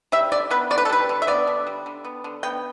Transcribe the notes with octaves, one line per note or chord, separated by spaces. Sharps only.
G3 E5
D3 D5
B3 B4
D3 D5
B4
A4
G3 B4
D3
E5
B3 D5
D3
G3
D3
B3
D3
B3 G5